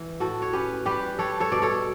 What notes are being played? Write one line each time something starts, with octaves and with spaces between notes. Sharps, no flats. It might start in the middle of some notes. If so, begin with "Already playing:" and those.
Already playing: E3
A2 F#4 A4
C#5
C#4 G4 B4
G3 G4 B4
G3 A4 C#5
A4 C#5
B2 D5
A4 C#5